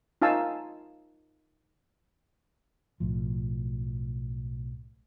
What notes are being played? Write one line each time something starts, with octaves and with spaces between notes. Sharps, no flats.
D#4 F4 F5 G#5 A5 E6
B1 A2 F3